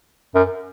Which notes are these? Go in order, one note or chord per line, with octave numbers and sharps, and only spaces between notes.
F#2